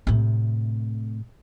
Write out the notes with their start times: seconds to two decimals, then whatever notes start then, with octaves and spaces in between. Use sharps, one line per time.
0.07 A2 C3